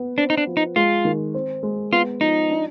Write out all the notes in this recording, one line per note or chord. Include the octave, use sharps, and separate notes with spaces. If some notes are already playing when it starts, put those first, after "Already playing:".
Already playing: B3
C4 D4
D#4
D4
F3
D#4
G#3 F4
D#3
C4
G#3
B3 F4
F3 D#4
D4